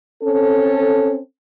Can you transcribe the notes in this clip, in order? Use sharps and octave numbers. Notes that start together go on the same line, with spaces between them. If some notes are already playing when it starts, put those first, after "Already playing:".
C4 C#4 A4